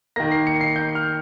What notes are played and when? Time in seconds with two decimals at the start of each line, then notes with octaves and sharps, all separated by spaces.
0.16 D#3 A#3 A#6
0.31 C7
0.47 C#7
0.61 C7
0.76 G6
0.95 F6